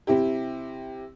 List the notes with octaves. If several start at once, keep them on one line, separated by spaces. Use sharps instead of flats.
C3 E4 G4